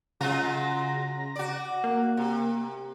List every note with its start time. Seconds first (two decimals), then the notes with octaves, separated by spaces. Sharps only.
0.21 C#3 F#3 G#3 F4 A#5 A#6
1.36 F#4 D5
1.84 A#3
2.17 C3